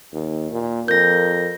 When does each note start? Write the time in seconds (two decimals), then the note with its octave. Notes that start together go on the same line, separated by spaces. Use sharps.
0.13 D#2
0.51 A#2
0.88 F2 A#4 G6 A#6